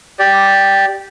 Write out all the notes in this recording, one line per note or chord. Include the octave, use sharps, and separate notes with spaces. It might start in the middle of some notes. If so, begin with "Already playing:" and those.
G4 D5